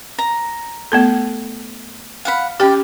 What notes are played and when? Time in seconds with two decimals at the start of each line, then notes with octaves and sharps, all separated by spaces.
0.19 A#5
0.92 A3 B3 A4
2.25 F5 F#5 B5
2.60 C#4 G4 D5 G5